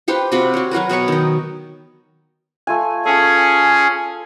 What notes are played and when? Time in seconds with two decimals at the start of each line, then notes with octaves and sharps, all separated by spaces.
0.08 F4 G4 B4 C5
0.32 C3 F4 F#4 B5
0.54 F#4 C#5
0.71 F#3 F#4 A#4 B4
0.89 B2 B4 C#5 C#6
1.08 D#3 D#4
2.67 A3 F4 G#5
3.05 C#4 G#4 A4 G#5